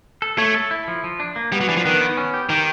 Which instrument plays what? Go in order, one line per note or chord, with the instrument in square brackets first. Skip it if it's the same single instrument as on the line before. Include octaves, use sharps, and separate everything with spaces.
[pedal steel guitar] A4
[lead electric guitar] A3 [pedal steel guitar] C#5
[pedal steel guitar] A4
E4
F3
F3
D4
A#3
[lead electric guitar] G3 [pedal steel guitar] B3
[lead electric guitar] F#3
[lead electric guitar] E3 [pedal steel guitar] D4
[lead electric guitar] F3
[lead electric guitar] D#3 [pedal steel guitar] B3
[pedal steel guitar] B3
C#4
G4
[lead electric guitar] D#3 [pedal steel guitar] G4